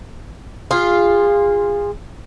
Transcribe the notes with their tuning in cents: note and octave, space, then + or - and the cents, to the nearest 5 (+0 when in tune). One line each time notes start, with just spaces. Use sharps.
F4 +0 G#4 -30